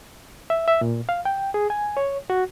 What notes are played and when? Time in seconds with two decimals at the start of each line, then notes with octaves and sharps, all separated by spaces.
0.50 E5
0.68 E5
0.81 A#2
1.09 F5
1.25 G5
1.54 G#4
1.70 G#5
1.97 C#5
2.30 F#4